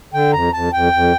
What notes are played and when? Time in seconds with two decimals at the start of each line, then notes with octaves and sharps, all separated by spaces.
0.14 D3 G5
0.33 F2 A#5
0.53 F2 A5
0.73 F2 G5
0.93 F2